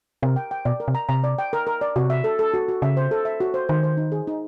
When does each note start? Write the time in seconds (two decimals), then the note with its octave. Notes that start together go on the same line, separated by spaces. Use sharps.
0.22 C3 A#4
0.36 G5
0.51 G5
0.65 B2 D5
0.80 A#4
0.88 C3
0.95 A#5
1.09 C3 A#5
1.24 D5
1.39 G5
1.53 A#4
1.67 A#4
1.81 D5
1.96 C3 F#4
2.10 E5
2.24 A4
2.39 A4
2.54 F#4
2.69 F#4
2.82 C#3 E5
2.97 C5
3.11 A4
3.25 E5
3.40 F#4
3.54 C5
3.69 D#3 C5
3.83 C5
3.97 D#4
4.12 G#4
4.27 D#4